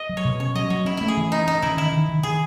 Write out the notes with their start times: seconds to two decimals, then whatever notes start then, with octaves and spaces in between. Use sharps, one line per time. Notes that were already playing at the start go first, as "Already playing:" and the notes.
Already playing: D#5
0.09 F#3
0.17 C#5
0.25 B2
0.40 C#4 C#5
0.55 F#3 D#5
0.70 F#3 C#5
0.85 C#4 E4
0.97 A3 E4
1.08 G#4
1.17 E3
1.32 C#4 D#4
1.47 C#4 D#4
1.62 E3 E4
1.77 D#3 E4
1.92 D#3
2.09 D#3
2.23 D#3 G#4